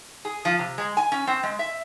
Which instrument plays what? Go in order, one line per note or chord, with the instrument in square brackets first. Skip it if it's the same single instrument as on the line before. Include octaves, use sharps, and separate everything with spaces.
[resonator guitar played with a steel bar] G#4
F3
C3
G#3
G#5
C#4
C4
G#3
E5